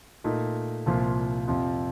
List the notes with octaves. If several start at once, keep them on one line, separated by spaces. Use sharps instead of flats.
A#2 A3 D#4
C2 A#2 F3 A#3 F4
F2 C3 F3 C4 F4